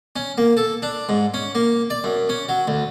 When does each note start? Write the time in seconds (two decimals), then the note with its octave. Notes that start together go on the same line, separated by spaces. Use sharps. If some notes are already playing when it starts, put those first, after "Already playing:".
0.16 C#4
0.38 A#3
0.57 A4
0.82 D4
1.09 G#2
1.34 C#4
1.55 A#3
1.90 D5
2.04 F#2
2.29 C#4
2.49 F#3
2.68 D2